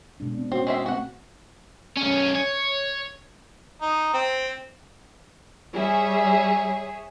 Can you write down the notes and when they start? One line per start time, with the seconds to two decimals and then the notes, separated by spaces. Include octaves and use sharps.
0.20 B2 G#3 D4
0.38 A#3 C4
0.52 C4 C#4 F#4
0.67 G#3 C4 E5
0.86 A3 B3 C4 F#4 F#5
1.97 B1 C#4
2.35 C#5
3.82 D#4
4.14 C4
5.73 G3 G#4 C#5 E5